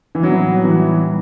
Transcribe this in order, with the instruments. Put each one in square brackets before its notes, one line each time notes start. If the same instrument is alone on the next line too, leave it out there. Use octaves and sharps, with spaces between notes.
[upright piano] E3
[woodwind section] A2 G3 B3 D#4 F#4 [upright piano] F#3
[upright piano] E3
[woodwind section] A2 G3 B3